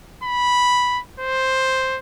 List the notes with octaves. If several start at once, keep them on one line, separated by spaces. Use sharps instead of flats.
B5
C5